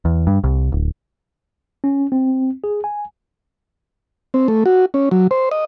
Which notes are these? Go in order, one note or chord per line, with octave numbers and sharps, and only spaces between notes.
E2
G2
C2
D1
C#4
C4
G#4
G#5
C4
A3
F#4
C#4
F#3
C5
D#5